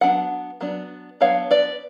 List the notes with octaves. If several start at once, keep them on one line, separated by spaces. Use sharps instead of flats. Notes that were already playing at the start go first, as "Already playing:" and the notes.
F#3 B3 D4 F#5
F#3 B3 D4
F#3 B3 D4 C#5 F5
B4 D5